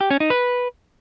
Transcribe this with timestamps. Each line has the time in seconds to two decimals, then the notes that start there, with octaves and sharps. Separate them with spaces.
0.01 G4
0.10 C#4
0.20 D#4
0.30 B4